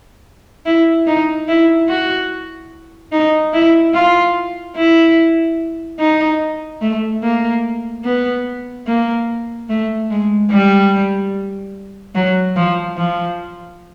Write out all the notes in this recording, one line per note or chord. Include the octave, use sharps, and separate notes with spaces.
E4
D#4
E4
F#4
D#4
E4
F4
E4
D#4
A3
A#3
B3
A#3
A3
G#3
G3
F#3
F3
F3